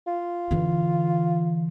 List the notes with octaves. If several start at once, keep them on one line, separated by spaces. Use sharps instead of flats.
F4
D3 E3